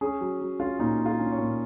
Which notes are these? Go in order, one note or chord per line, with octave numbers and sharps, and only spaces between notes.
C#4 G#4
F#3
F#3
C#4 F4
A#2 D#4
C#4
F4
C#4
C#5
A#2